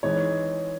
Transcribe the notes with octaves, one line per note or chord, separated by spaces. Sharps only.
E3 G#3 C4 D#4 C#5